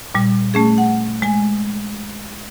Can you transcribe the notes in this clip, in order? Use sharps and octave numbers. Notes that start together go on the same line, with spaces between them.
A#2 G3
A3 C#4 G#4
F#5
G#3 G#5